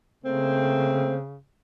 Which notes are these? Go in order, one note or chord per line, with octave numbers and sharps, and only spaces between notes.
C#3 A3 A#3 C4